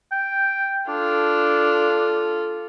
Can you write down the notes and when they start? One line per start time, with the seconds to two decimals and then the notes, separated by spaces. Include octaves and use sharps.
0.12 G5
0.89 D4 F4 A4